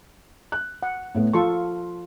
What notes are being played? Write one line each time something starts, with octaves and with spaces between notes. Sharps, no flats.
F#6
F#5
A2 A3 B3
F3 F4 A4 C6 C#6